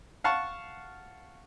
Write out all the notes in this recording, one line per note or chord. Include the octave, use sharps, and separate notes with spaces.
F5 F#5 A5 C#6